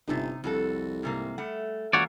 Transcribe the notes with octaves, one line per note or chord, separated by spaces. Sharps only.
G1 C3 D#4
C2 F2 F#4 A4
G#2 C3 A#3
G3 A3 F#5
C#2 E3 A#3 F#4 C#5 D5